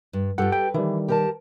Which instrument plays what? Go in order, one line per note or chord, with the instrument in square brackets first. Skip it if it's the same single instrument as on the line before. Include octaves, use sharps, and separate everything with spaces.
[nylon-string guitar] G2
[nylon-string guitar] G2 F4 [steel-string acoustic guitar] G4 A4 [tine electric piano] F#5
[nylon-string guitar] B4 [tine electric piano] G5
[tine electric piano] D#3 G3 [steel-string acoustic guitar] E3
[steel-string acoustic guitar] G4 A#4 A5